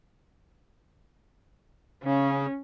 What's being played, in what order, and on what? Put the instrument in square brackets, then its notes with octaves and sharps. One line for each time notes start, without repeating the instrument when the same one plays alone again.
[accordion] C#3 [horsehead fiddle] C#4